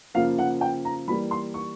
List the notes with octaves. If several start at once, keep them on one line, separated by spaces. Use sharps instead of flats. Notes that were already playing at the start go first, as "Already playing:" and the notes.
C#3 F3 A#3 F5
F#5
G5
A#5
E3 G3 A#3 B5
C6
C#6